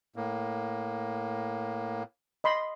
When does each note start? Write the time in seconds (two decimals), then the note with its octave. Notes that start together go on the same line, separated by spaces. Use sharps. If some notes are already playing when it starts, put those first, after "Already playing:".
0.16 A2 A#3
2.44 D#5 B5 C6